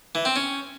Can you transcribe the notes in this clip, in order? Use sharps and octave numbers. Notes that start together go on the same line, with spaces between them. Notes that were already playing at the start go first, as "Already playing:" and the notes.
E3
C4
C#4